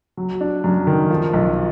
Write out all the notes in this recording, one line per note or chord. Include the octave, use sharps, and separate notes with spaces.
F#3
D4
F#2
D#3
F3
B1